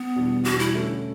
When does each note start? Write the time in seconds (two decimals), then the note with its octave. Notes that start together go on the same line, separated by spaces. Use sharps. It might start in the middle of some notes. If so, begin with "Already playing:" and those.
Already playing: B3
0.16 E2 B2 G3 D4
0.45 E2 B2 G3 D4 F#4
0.59 E4
0.74 D3 A3 C#4 F#4